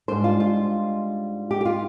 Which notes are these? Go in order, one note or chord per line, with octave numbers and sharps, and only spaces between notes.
G#2 G3 D4 C5
F4
F4
G4
G4
F4